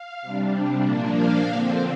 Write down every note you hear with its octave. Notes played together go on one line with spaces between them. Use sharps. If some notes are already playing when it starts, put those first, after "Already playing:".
Already playing: F5
C3 G3 D4
A#2 F3 A#3 D4
F5
D3 F3 C4